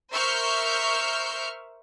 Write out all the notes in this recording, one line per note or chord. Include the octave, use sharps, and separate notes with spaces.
A#4 C5 E5 C#6 F6 G6